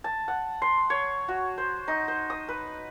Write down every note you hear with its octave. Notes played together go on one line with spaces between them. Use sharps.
A5
F#5
C6
C#5
F#4
C5
D#4
C5
D#6
B4